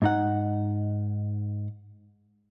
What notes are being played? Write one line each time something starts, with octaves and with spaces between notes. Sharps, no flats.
G#2 D#4 F#5